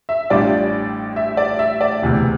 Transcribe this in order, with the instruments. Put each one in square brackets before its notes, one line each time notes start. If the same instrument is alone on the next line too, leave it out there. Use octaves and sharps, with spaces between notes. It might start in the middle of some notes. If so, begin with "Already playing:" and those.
[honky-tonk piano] E5
[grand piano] A1 A2 G3 D4 F4 [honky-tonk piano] D5
[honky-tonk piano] E5
D5
E5
D5
[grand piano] E1 D2 C3 E3